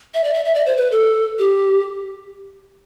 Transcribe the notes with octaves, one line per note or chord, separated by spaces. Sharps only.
E5
D5
E5
E5
D5
C5
B4
A4
G4